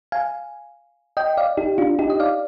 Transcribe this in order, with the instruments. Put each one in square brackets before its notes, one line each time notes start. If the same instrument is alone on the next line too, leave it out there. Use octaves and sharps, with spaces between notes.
[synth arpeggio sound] F5 G#5
D#5 G5
D5 F5
D#4 G4
D4 F4
D#4 G4
D#5
D5 F5